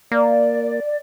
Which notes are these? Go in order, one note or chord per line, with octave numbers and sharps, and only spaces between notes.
A#3 D5